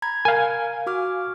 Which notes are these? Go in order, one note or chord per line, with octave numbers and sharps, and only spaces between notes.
A#5 B5 G#6
A#4 F5 G#5
F#4 D6 F6